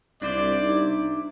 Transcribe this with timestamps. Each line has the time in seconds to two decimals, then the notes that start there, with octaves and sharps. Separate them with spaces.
0.22 C2 D4 E4 C5 D5
0.58 D#4